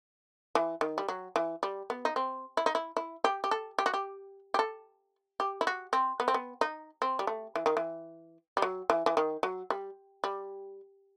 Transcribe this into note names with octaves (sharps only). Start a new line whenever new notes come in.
E3
D#3
G3
F#3
E3
G3
B3
D#4
C4
E4
D#4
E4
E4
G4
G4
A4
G4
F#4
G4
G4
A4
G4
E4
F#4
C4
B3
C4
B3
D#4
C4
G3
A3
E3
D#3
E3
G3
F#3
E3
E3
D#3
F#3
G3
G3